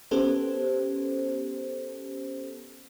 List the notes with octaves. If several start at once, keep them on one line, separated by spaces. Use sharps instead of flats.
B3 C#4 G4 A4 C5